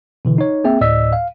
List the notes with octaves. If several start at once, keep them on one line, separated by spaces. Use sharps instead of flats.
B2 D3 E3
D#4 C#5
A#3 C4 G#4 E5 G5
D2 A2 D5 D#5 E6 B6
F5